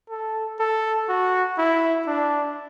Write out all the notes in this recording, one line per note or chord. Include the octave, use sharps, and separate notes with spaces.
A4
A4
F#4
E4
D4